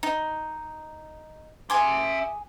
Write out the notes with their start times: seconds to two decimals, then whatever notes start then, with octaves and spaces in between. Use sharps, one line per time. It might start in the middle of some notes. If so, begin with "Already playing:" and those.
0.03 D#4
1.70 G#4 E5 G#5 C6 D6